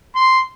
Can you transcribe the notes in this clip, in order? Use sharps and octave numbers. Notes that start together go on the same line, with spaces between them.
C6